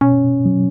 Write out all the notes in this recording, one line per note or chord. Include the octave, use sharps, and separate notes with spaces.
B2 C#4
F#3